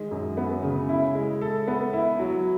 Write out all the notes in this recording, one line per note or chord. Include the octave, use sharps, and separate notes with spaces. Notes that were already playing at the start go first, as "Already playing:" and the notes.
Already playing: D#3 G#3
F#2
B3
C#3
E4
G#3
A4
B3
E4
F#3